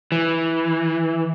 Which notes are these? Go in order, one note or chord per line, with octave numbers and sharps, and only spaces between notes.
E3